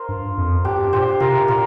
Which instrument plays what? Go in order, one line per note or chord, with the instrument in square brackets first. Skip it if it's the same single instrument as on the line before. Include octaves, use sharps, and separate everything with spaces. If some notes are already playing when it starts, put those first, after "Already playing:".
Already playing: [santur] F4 A#4 C5
[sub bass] G2
F2
[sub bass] G2 [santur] D4 G4
[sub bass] A#2 [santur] G4 C5
[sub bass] C3 [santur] F4 A#4
[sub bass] A#2 [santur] F4 A#4